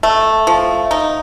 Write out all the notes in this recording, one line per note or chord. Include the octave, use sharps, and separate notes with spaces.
A3
F3
D#4